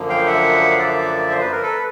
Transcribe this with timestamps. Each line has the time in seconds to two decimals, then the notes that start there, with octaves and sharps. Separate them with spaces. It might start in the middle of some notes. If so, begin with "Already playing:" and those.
Already playing: F#2 D3 F3 A#3
0.09 F5 G5
0.27 E5 F#5
0.71 F5
0.79 D5 E5
1.31 C5
1.41 B4
1.52 A#4
1.63 A4 B4